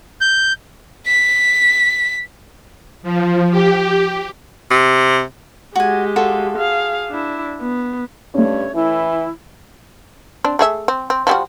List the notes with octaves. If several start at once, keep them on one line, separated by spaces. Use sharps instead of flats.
G6
B6
F3
G4
C3
G#3 F#4 G4 G#5
F4 F#4 A4
G#4 F5
D4 E4
B3
G2 A3 C#4 C#5
E3 E4
C4 D4
A3 G#4 E5
C4
C4
F3 G3 F#4